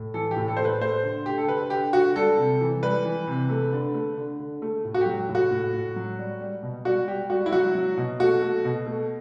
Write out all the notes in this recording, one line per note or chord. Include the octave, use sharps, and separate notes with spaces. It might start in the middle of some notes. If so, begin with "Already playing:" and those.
Already playing: A2
E3 A4
G4
A2
A4
A2 C5
B4
A3 C5
D3
D3 G4
A4
D3 B4
D3 G4
D3 F#4
G3 A4
C3
E3
G3 B4
E3
C3
A3
D3
A3
D3
D3
A3
A2
F#4
F#3 G4
A2
F#4
A2
A2
F#3
G3
G3
B2
G3 F#4
G3 G4
G3 F#4
E4
F#3 F#4
F#3
B2
A3 F#4
A3
B2
A3